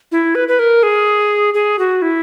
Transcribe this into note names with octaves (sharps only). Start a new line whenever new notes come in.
E4
B4
B4
A#4
G#4
G#4
F#4
E4